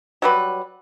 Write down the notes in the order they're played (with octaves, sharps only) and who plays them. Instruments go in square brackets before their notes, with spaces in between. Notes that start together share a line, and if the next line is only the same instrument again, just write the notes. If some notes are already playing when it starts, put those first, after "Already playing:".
[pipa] F#3 G3 B4